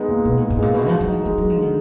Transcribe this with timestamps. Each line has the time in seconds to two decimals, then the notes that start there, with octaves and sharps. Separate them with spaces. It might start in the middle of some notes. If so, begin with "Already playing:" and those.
Already playing: G#3 B3 D#4
0.08 A#2
0.25 B2 B3
0.38 A#2 G#3
0.50 G#2
0.59 A#2 G#3
0.74 B2 F#4
0.88 F3 G#3
1.00 F#3
1.08 F3 D#4
1.24 F3 G#3
1.38 F#3 G#3
1.50 F3
1.57 D3 D#3